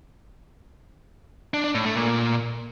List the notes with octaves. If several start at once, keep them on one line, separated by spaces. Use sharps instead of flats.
D4
D4
A2
A3
A#2